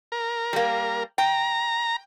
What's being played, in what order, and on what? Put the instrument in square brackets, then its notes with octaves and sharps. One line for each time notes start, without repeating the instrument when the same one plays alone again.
[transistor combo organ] A#4
[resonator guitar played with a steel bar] G3 A#3
[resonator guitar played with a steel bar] G5 [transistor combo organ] A#5